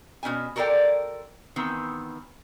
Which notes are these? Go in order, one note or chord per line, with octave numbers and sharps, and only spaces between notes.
B2 C#4 E4 G#5
F#4 A4 A#4 C5 D5 G5
D#3 E3 B3 C4